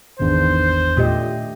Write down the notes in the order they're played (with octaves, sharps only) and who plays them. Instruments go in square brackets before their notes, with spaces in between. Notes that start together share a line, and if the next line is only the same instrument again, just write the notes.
[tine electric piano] G#1 E2 [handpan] D#3 D4 [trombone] C5
[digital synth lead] A#2 [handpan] A3 G4 D#5